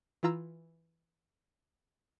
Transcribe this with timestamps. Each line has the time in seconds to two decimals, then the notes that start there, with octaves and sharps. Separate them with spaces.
0.23 E3 E4 F4 A#5 E6